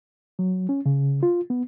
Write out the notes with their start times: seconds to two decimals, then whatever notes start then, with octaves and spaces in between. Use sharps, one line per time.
0.39 F#3
0.69 C#4
0.86 C#3
1.23 F4
1.50 B3